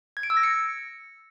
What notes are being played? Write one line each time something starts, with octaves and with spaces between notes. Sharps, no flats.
G#6
D7
E6
A#6
C#7